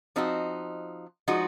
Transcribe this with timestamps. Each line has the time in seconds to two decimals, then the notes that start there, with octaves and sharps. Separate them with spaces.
0.16 F3 C4 D#4 F#4
1.28 F3 G#3 D#4 F#4